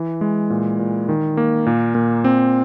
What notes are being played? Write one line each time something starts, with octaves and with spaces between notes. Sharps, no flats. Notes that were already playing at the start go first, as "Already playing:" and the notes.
Already playing: E3
G#3
A#2
A#2
D#3
A#3
A#2
A#2
C4